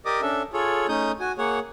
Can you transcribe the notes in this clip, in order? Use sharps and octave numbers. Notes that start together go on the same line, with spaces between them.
G4 A#4 D5 D#5 D6 D#6
C#4 D4 A4 E5
F4 G#4 A4 C#5
A3 C#4 D#4 D#6 G6
F#4 G#5
A#3 G#4 C#5 F#5